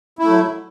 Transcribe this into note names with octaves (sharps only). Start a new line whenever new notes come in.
F#3 A3 E4